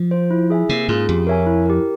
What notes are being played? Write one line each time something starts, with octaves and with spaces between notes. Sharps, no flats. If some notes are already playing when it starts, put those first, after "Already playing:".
Already playing: F3
F4 C5
E4
G#4 E5 G#5
C3 A#3
G#2 C#4 F4 G#4
F2 G4
A#4 C#5 E5 G#5
E4
G4 A#4